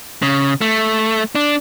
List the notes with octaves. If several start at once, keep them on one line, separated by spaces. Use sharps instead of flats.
C#3
A3
D4